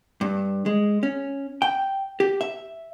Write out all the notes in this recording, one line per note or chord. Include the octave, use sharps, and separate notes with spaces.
G2
G#3
C#4
G5
G4
E5